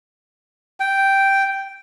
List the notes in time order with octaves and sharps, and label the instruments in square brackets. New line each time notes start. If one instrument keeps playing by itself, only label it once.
[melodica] G5